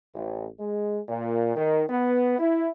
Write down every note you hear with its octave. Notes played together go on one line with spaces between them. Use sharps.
A1
G#3
A#2
D#3
B3
E4